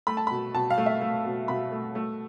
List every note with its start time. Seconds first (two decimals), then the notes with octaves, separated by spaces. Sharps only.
0.07 A3 B5
0.17 A5
0.27 B5
0.31 B2
0.54 B2 A5
0.70 F5
0.78 A3
0.86 E5
1.01 A3
1.25 B2
1.48 B2 B5
1.72 A3
1.95 A3